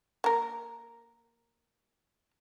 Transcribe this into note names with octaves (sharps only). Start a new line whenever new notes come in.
A#3 A#4